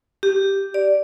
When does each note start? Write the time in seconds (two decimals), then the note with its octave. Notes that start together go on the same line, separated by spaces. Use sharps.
0.23 G4
0.74 D5